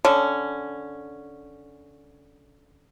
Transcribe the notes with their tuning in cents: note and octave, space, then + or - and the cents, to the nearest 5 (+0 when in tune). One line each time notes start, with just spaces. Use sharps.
D3 -10 C#4 +0